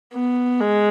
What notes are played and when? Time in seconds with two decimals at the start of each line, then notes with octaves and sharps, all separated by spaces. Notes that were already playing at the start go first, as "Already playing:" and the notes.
0.13 B3
0.61 G#3